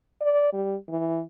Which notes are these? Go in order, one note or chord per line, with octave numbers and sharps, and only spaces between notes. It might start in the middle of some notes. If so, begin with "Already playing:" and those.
D5
G3
E3